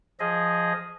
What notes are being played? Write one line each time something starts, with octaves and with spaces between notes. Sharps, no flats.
F3 G#4 D#5